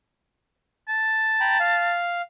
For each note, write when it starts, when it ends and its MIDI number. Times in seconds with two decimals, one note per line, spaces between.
0.89 1.98 81
1.40 1.57 79
1.40 1.57 82
1.40 1.57 83
1.60 2.22 77